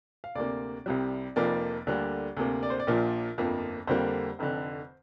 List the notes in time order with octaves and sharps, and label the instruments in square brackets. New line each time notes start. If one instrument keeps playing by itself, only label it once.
[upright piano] F5
D2 C3 A#3 D5
C2 C3 G3
F1 F2 F3 A#3 D5
D2 D3 G3 A#3
D2 C3 A#3
D5
C5
D5
A#1 A#2 F3 A#3
G1 F2 F3 A#3
F2 D3 G3 A#3 C5
F1 F2 D3